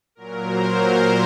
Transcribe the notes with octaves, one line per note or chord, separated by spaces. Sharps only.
A#2 F#3 A#4
C5
C5